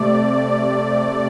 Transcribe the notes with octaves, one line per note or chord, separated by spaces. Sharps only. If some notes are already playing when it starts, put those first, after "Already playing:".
Already playing: C3 A3 D5